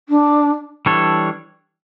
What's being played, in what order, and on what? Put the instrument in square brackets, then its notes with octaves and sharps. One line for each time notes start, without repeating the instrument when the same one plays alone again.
[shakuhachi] D4
[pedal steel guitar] E3 G3 D4 A4 C#5